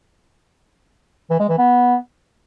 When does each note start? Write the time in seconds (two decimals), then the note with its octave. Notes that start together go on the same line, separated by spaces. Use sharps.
1.30 E3
1.40 G#3
1.49 E3
1.58 B3